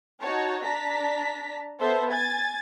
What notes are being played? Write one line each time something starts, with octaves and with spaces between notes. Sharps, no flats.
D#4 F#4 C#5 A5
D4 A5 A#5 B6
B3 A4 C5 E5
G#5 G#6 A6